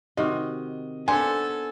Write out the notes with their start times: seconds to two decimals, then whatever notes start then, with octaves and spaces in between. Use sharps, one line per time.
0.17 C3 D#3 F#4 D#5
1.08 B3 D4 A4 C5 G#5